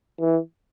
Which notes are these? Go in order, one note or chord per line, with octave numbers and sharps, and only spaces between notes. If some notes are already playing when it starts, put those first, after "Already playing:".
E3